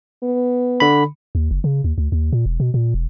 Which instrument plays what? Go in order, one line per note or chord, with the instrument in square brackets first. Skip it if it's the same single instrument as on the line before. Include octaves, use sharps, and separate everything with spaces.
[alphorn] B3
[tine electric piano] D3 B5
[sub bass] D#2
F#1
C#3
D#2
D2
D#2
A#2
E1
B2
A#2
E1